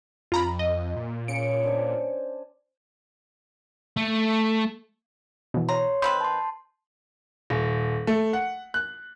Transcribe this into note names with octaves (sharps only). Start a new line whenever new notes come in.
F2 F4 A#5 B5
D#5
A#2
C#3 C#7 D7
D4 C5 G#5
A3
B2 E3
C#5 A#5 C6
D#3 C4 B4 B5 G6
A5 C6
D#1
A3
F#5
F#6